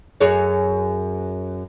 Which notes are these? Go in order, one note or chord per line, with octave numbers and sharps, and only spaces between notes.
F#2 G#4 C#5